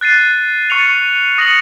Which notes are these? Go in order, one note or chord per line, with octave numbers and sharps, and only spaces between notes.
F#6 A6 C7 D#7
C#6 F6 A6 C#7 F7
D#6 A#6 C#7 F#7